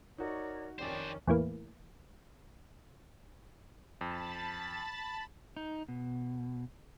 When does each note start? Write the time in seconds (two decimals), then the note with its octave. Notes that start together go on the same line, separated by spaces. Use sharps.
0.18 D#4 F#4 A#4 C#5 D5
0.79 F2 D#3 C#4 D4 G4 C5 D5 G5
1.27 E2 A2 E3 A#3
4.01 F2 A5 B5 A6
5.57 D#4
5.88 B2